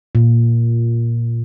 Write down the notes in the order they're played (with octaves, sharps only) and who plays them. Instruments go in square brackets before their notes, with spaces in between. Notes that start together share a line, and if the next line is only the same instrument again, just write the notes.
[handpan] A#2